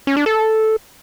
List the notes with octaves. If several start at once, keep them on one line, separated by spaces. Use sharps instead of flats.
C#4
D4
A4